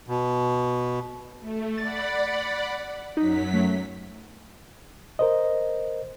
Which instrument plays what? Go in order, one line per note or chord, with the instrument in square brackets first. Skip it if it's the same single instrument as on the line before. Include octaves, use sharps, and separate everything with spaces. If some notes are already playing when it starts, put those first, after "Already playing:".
[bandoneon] B2
[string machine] A3
[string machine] D5 F#5 B5 [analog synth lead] A6
[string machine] F#2 F#3 B6 [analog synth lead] D#4
[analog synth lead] A3
[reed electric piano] A#4 C5 D#5